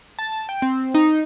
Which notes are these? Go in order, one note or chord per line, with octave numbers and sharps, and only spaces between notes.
A5
G5
C4
D#4